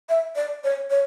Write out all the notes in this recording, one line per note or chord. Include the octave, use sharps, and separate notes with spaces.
E5
D5
C#5
C#5